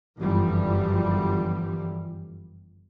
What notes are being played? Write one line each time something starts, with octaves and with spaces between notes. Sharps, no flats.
G1 F#2 E3 F3 G3